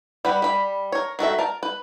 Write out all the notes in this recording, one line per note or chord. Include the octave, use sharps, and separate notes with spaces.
G3 B4 F#5
G3 B5
A#4 C#5
D#3 F#4 A4 E5
A#4 A5
B4